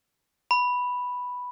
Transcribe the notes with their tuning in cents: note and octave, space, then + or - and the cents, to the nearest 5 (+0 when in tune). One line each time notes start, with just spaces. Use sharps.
B5 +0